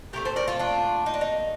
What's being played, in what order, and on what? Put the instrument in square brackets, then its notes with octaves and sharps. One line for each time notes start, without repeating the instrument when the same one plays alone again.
[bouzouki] A#2 A3 C4 G4 A#4
A4 C5
A#4 D5
F4 A4
D4 F4
D#4
D4
D#4